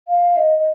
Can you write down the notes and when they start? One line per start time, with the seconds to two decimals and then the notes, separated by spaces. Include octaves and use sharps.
0.08 F5
0.37 D#5
0.59 D#5